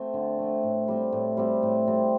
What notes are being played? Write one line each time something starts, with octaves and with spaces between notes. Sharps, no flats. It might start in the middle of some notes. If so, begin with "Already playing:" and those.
Already playing: A3 C4
D3
A3 C4
A2
G3 C4
A2
G3 C4
A2
G3 C4